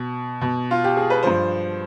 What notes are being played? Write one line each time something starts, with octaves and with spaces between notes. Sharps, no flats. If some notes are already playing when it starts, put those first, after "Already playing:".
Already playing: B2
B2
F4
G4
G#4
B4
G2 F3 C5